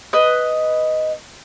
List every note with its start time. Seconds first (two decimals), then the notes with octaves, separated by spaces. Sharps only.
0.13 B4 D#5